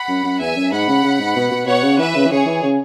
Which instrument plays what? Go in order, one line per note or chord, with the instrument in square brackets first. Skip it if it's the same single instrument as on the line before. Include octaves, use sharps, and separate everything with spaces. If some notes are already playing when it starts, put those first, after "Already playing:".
Already playing: [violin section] F#5 B5
[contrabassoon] F#2
F#2
[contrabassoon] E2 [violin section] E5 G#5
[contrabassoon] F#2
[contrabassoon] G#2 [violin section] F#5 B5
[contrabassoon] C#3
C#3
G#2
B2
B2
[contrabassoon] B2 [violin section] C#5 F#5
[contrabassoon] C#3
[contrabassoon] E3 [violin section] B4 E5
[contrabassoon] C#3
E3
[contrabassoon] C#3 [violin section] G#4 C#5
[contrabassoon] E3
C#3